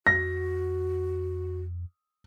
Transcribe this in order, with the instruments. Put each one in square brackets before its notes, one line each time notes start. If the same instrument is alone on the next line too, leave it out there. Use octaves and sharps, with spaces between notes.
[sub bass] F2 [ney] F#4 [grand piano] A#6